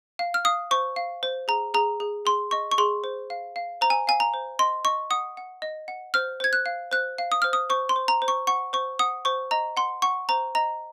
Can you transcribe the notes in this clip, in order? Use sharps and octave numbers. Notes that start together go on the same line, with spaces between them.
F5
F6
F5 D#6
C5 C#6
F5
C5
G#4 A#5
G#4 A#5
G#4
G#4 C6
D#5 C#6
C#6
G#4 C6
C5
F5
F5
C5 A#5
G#5
F5 G#5
A#5
C5
D#5 C6
D#5 C#6
F#5 D#6
F#5
D#5
F#5
C5 F6
C5 G#6
F#6
F5
C5 F#6
F5
D#6
C5 F6
D#6
C5 C#6
C6
C5
A#5
C5
C#6
F#5 C#6
C5 C#6
F#5 D#6
C5 C#6
D#5 A#5
F#5 C6
F#5 C#6
C5 A#5
D#5 A#5